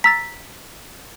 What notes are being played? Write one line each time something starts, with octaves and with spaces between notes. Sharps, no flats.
A#5 E6 A6 B6